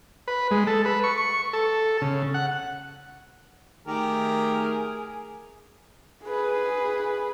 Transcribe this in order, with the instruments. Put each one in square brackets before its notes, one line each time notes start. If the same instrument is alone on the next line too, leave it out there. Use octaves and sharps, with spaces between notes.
[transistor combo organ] B4
G#3
A4
B4
C#6
C#6
A4
C#3
F#5
[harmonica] D#3 G4 [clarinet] A3 [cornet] G#4 [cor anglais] A#4
[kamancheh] G#4 B4